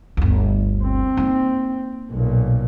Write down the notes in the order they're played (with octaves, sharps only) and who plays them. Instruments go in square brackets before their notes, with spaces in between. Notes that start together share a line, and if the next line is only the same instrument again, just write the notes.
[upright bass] G1 D2
[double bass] C4
[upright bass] A#3 D#4
[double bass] B1 A#2